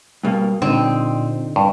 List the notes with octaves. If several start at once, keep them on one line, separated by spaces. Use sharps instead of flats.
G2 B2 A#3
A#2 D3 C4 D#4
G2